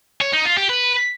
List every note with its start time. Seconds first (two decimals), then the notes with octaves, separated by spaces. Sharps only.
0.21 C#5
0.33 D#4
0.45 F4
0.57 G4
0.69 B4